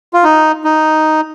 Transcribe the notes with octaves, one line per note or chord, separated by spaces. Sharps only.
F4
D#4
D#4